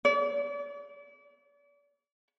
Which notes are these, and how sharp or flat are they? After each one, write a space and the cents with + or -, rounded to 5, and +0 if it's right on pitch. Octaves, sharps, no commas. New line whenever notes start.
D5 -40